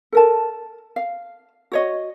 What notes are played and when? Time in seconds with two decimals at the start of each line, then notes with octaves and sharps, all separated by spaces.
0.12 A4 A#4 A5
0.96 F5
1.72 F#4 C#5 D#5